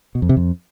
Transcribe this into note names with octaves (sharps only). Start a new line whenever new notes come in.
B2
F2
C3
F2